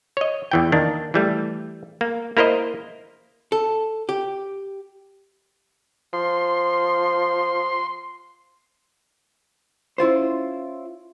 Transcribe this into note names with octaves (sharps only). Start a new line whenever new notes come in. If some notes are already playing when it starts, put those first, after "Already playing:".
C#5 D#5
E2 E3 G5
D#3 A#3 D4
E3 G3 A3
A#3
A#3 E4 A#4 C5 D#5
A4
G4
F3 C6
C#4 E4 F4 C5